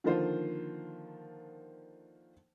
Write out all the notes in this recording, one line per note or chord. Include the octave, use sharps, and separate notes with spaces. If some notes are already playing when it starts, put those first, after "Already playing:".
D3 D#3 F3 A#3 F4 C5